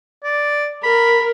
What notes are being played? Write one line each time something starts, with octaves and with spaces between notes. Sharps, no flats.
D5
A#4 B5